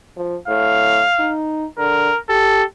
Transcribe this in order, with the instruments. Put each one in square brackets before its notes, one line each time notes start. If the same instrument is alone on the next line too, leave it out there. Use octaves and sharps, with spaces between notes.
[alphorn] F3
[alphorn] A2 [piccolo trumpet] F5
[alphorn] D#4
[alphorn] D3 [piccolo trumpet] A#4
[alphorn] G4 [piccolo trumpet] A4